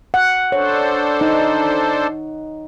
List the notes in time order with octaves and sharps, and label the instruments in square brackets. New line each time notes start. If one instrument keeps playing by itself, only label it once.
[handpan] F#5
[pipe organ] D4 A4 C5 [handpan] C#5
[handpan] D#4